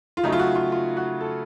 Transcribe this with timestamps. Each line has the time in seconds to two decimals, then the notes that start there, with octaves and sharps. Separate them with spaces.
0.17 F4
0.23 C#3 F#3 A3 D#4
0.32 F4
0.39 F#4
0.55 F4
0.72 F4
0.97 F#4
1.21 A4